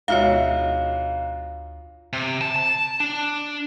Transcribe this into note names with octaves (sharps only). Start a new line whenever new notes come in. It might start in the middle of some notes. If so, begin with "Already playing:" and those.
D2 G#2 B2 F4 C#5 E5 F5
C3
A5
A5
D4